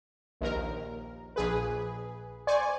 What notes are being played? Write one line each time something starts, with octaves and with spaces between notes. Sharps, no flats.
A#1 D#2 A#4
A#1 G#4 B4
C5 D5 G#5 C#6